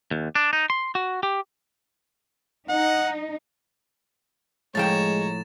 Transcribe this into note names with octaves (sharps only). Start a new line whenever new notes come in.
D#2
D4
D#4
C6
F#4
G4
D#4 F#5
A2 F3 G#3 C#5 G5 A#5 A6 E7